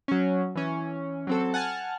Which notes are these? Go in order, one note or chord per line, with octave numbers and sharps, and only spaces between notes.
F#3 C#4
E3 C#4
F#3 C4 A4
F#5 G#5 A5 F6 F#6